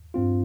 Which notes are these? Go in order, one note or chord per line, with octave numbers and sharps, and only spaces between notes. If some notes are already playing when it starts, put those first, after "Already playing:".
G2 G3 C4 F4